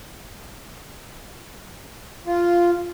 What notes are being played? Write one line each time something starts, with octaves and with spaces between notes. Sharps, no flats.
F4